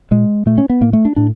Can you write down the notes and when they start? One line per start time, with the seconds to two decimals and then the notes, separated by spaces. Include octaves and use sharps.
0.11 A#2 G#3
0.46 A#2 A3
0.58 C#4
0.70 B3
0.81 A2 A#3
0.93 A3
1.05 D4
1.16 A2 D4